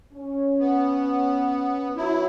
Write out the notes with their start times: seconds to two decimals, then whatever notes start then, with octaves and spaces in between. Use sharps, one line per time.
0.13 C#4
0.59 B3
1.97 F#3 E4